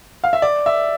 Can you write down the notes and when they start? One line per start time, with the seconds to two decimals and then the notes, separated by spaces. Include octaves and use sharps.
0.24 F5
0.33 E5
0.42 D5
0.66 E5